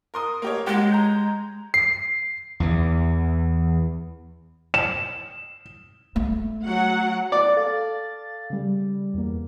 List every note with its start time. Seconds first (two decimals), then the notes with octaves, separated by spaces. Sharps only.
0.14 A#4 C6 D#6
0.42 A#3 G4 C#5
0.67 G#3 G4 F#5
0.92 A#5 G6
1.74 C7
2.60 E2 E3
4.74 E7
6.16 A3
6.66 F#3 F#5
7.32 D5
7.57 A4 F5 A6
8.50 C#3 G3
9.14 E2 A#3